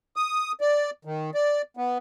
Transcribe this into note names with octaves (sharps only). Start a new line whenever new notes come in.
D#6
D5
D#3
D5
B3